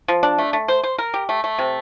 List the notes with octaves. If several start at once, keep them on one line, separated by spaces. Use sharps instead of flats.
F3
D4
A3
A3
C5
C5
A#4
G4
A3
A3
C3